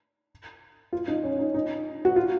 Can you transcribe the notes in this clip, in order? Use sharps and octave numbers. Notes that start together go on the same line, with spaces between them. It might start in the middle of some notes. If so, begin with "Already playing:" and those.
F4
D#4
C#4
D#4
D#4
F#4
F4